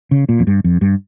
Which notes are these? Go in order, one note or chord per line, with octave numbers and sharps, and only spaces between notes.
C#3
A#2
F2
G2
F2
G2